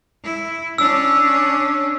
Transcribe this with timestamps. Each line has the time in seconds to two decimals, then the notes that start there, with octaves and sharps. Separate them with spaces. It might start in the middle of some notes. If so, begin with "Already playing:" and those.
0.24 E4
0.78 C#4 D4 E6